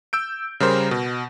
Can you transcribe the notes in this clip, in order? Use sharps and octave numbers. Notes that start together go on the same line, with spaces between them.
E6 G6 D7
C#3 G3 A#4 C5
B2